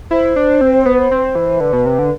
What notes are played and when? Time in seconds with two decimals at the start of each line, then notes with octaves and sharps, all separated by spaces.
0.11 E4 C5
0.36 D4
0.61 C4
0.85 B3
1.11 C4
1.35 E3
1.60 D3 B4
1.73 B2
1.86 C3
1.99 D3